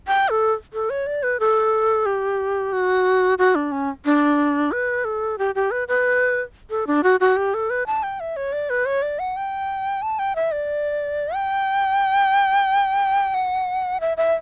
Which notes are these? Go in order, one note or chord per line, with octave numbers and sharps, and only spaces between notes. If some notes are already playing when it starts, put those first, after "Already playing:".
G5
A4
A4
C#5
D5
B4
A4
G4
F#4
F#4
D4
C#4
D4
B4
A4
G4
G4
B4
B4
A4
D4
F#4
F#4
G4
A4
B4
A5
G5
E5
C#5
D5
B4
C#5
D5
F#5
G5
A5
G5
E5
D5
G5
F#5
E5
E5